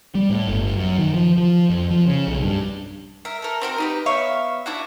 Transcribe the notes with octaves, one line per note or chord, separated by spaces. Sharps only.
G3
A2
G1
F#2
D#3
F3
F3
F2
F3
C#3
B1
G2
A#4 E5
A4 A#4
C4 F#4 A#4
D#4 G4 B4
B3 C#5 E5 F5
D4 E4 F#4